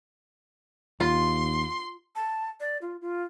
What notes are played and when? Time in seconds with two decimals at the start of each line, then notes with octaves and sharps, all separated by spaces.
1.00 D#2 F4 C6
2.16 A5
2.60 D5
2.82 F4
3.01 F4